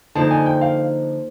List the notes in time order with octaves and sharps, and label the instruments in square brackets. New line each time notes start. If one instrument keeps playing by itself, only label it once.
[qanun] D3 F3 A#3 D#4 [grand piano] A5
[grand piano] G#5
G5
F5